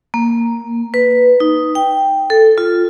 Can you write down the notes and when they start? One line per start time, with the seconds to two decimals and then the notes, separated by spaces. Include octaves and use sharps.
0.14 A#3
0.94 B4
1.40 D#4
1.75 G5
2.30 A4
2.58 F4